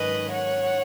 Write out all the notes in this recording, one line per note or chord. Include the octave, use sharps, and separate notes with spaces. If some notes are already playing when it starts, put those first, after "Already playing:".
Already playing: G#2 D#3 F#3 C#4 B4 D#5
C#5 F#5